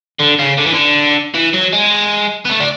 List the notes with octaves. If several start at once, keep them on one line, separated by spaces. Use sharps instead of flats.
D3
C#3
D3
E3
D3
E3
F#3
G#3
B3
A3
D4